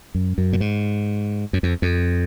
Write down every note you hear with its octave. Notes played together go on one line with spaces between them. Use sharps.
F#2
F#2
A#2
G#2
F#2
F2
F2